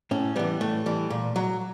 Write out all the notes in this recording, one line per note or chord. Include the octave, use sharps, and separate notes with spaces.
A2 C#4
E3 G3 B3
A2 A3
E3 G3
A#2
F#3